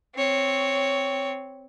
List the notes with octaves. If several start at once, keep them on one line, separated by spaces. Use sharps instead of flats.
C4 C#5